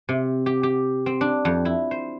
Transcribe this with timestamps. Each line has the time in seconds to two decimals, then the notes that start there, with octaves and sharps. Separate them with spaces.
0.09 C3
0.46 G4
0.63 G4
1.06 C4
1.21 D4
1.45 F2
1.65 E4
1.91 C5